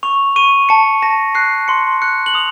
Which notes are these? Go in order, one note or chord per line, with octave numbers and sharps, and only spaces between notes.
C#6 F7
C#6 D#7
A5 C#7
A5 A#6
F#6 C7
C6 C#7
F#6 C#7
F#7
D#6 F7